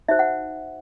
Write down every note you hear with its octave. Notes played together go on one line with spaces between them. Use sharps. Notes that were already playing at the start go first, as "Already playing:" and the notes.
D#4 F#4 C5 E5
F#5